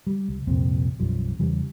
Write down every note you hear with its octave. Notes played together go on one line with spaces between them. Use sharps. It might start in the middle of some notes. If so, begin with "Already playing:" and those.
G3
C#2
C2 F2 A#2 C4
B1 F#2 F3 G3
E2 C#3 E3 G3